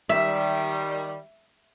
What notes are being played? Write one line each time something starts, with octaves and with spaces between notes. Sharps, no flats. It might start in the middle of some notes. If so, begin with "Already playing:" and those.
D#3 G3 E5